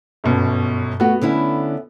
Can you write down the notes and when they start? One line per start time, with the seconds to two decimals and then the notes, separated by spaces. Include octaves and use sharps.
0.24 G1 F#2 B2
1.00 A3 B3 F#4
1.22 D3 C#4 E4